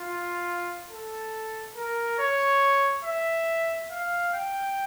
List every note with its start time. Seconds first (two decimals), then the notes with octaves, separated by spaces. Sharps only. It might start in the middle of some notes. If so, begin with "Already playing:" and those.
Already playing: F4
0.89 A4
1.76 A#4
2.19 C#5
3.04 E5
3.90 F5
4.34 G5